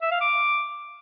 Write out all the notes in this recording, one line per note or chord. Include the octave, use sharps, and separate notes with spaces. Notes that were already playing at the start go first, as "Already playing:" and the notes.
E5
F5
D6